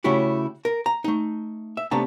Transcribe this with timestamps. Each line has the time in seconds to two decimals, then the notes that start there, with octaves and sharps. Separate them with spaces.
0.04 C#3 A3 C#4 E4 F#4 G4
0.65 A#4
0.86 A#5
1.04 A3 D#4
1.77 E5
1.91 C3 A3 B3 D4 A5 A#5